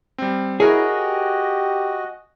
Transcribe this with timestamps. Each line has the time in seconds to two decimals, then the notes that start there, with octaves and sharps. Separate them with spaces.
0.18 G3 C4
0.60 E4 F#4 G#4 A#4 C#5 D#5
0.89 G4